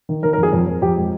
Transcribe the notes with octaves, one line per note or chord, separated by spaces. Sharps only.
D#3
D#3 A#4
A#4
F2
G#4
F2
F2
F2 G4
G#3